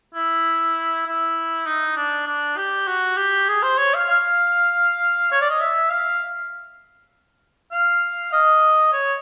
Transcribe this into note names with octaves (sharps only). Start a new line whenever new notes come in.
E4
E4
D#4
D4
D4
G4
F#4
G4
G#4
C5
C#5
F5
F5
C#5
D5
D#5
E5
F5
F5
D#5
C#5